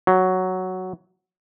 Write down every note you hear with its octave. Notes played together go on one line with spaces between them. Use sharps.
F#3